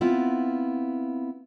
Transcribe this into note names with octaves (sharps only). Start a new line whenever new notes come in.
B3 C4 E4 F4